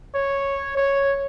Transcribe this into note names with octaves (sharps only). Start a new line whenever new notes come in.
C#5
C#5